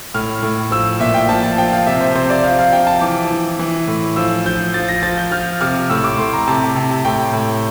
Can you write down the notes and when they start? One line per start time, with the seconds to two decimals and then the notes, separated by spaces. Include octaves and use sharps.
0.14 A2 F6
0.43 A2
0.71 F3 E6
1.00 A#2 E5
1.14 G5
1.28 F3 A5
1.43 A5
1.58 F3 G5
1.72 F5
1.86 C3 E5
2.01 C5
2.15 C3 C5
2.30 D5
2.44 F3 F5
2.59 F5
2.72 F3 G5
2.87 A5
3.01 E3 D6
3.31 E3
3.59 E3
3.87 A2
4.16 F3 E6
4.46 F3 G6
4.74 F3 A6
4.88 A#6
5.03 F3 A6
5.18 G6
5.31 F3 F6
5.61 C3 F6
5.90 A2 E6
6.04 D6
6.18 A2 C6
6.33 A#5
6.48 C3 A5
6.76 C3
7.05 A2 G5
7.33 A2